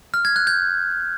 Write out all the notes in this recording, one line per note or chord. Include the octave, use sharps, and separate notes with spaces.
F6
G#6
F#6
G6